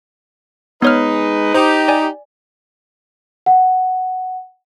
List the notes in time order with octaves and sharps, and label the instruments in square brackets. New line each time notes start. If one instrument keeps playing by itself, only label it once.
[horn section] G#3 D#4 B4 [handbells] B3 C#5 F6
[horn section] D#4 G4 [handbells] C5
[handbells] D5 G#5
[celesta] F#5